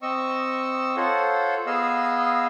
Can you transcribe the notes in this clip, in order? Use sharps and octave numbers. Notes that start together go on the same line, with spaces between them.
C4 D#5 C#6 E6
F4 A4 C5 C#5 F#5
B3 G#4 D#5 F5 E6